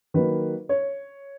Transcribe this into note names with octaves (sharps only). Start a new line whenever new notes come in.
D#3 F#3 A#3 B4
C#5